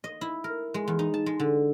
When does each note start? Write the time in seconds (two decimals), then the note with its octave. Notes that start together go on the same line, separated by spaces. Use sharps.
0.04 D#5
0.21 E4
0.44 A#4
0.74 G#3
0.88 E2
0.99 D#4
1.14 A5
1.26 G#3
1.40 D3